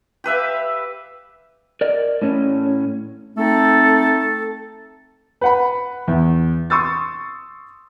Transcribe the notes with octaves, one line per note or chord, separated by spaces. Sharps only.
G4 B4 E5 F5
A#4 D5 D#5
A2 C#4
A3 C4 D#4 A4
B4 F#5 B5
E2
C6 C#6 D#6 E6 A6